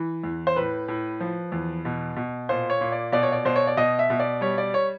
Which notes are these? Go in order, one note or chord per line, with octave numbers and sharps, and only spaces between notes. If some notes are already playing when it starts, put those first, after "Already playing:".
Already playing: E3
E2
C5
A2 B4
A2
F3
E2
B2
B2
A#2 C5
C#5
A#2
D5
B2 D5
C#5
D5
B2 C5
C#5
D5
B2 D#5
E5
B2
D5
G3 C#5
D5
C#5